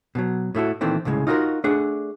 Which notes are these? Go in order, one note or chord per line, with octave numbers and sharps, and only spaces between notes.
B2 D#3 F#3
A2 A3 E4 F#4
A#2 D#3 E3 A3 C4
C2 A2 C#3 G#3
D#4 F4 F#4 G#4 A#4
A3 D4 G#4 F#5